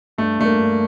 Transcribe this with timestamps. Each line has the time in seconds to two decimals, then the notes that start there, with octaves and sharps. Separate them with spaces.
0.18 G2 A3
0.39 G2 A3
0.46 A#3
0.59 G2